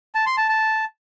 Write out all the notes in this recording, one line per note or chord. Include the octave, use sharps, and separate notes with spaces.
A5
C6
A5
A5